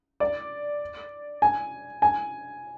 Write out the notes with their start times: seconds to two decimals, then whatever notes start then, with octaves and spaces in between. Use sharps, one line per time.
0.20 D5
1.42 G#5
2.02 G#5